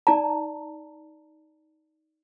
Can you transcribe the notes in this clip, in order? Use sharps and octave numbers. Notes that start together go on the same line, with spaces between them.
D#4 D5 A5 A#5